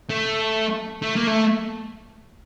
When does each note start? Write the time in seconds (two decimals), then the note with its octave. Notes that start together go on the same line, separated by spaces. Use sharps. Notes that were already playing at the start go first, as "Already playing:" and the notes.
0.09 A3
1.03 A3
1.16 A#3
1.28 A3